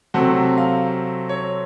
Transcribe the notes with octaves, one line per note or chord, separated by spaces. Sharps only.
C3 F#3 A3 C4 F#5
F5
C#5